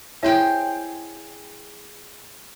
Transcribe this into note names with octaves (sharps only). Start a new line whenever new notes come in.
E4 G#4 C5 C#5 E5 G5